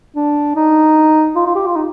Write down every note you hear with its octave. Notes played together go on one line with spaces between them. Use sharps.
D4
D#4
F4
F4
G4
F4
D#4